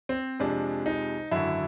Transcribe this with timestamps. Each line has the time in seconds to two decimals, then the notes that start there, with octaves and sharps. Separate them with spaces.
0.09 C4
0.39 F2 C3 F3 G#3 D4
0.86 D#4
1.31 G#1 F#2 D3 E4